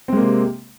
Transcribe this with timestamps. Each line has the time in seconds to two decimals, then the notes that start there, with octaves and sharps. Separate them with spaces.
0.08 C4
0.13 G#3
0.17 A#3
0.21 C3